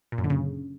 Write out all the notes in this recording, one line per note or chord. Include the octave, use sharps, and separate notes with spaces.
A#2
F#2
D3
C#3